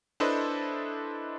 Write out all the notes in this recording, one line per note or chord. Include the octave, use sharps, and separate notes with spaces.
D4 E4 A4 B4 C5 D#5